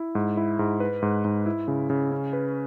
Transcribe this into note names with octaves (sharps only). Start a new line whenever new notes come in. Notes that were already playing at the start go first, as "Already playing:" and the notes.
Already playing: E4
G#2
E4
G#2
B4
G#2
G#2
E4
C#3
C#3
C#4
B4